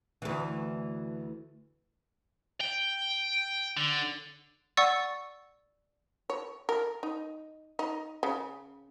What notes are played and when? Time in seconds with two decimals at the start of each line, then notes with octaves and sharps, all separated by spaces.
0.22 D2 E3
2.61 G5
3.77 D3
4.77 D5 F#5 C#6 E6 A6
6.30 C#5
6.69 A#4
7.03 D#4
7.79 D#4
8.23 C#3